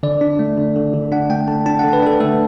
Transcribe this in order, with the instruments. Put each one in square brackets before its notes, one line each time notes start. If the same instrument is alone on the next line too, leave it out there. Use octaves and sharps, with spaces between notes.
[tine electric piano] D3 D5
D4
A3
D3
D3
D3
D4 F#5
A3 G5
D3 A5
D4 A5
F#5
D3
B4
D4 A4
A3 A4